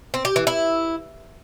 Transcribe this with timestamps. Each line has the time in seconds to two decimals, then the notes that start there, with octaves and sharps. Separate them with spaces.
0.14 C4
0.25 G4
0.36 E3
0.47 E4